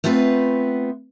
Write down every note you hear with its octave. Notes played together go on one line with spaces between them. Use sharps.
A3 B3 C4 F4 B4